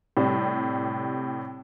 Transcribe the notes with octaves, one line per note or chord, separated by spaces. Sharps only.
A2 C3 G3